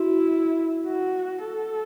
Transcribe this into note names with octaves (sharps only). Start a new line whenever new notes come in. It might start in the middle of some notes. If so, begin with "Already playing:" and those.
Already playing: E4 F#4
F#4
A4